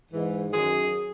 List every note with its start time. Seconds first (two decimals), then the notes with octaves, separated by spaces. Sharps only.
0.11 G#2 E3
0.52 F#2 D#3 F#3 G#4